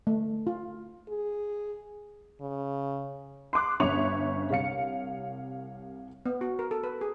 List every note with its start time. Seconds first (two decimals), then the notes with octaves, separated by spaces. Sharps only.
0.07 A3
0.47 F4
1.08 G#4
2.41 C#3
3.53 C6 D6 F#6
3.80 G1 C#4 C#5 E5 C#6 F7
4.50 C2 C#5 F5 C#7
6.26 B3
6.41 F#4
6.59 A#4
6.71 A4
6.84 B4
7.01 G#4